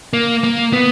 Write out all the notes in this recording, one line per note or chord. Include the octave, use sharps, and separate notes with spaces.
A#3
A#3
B3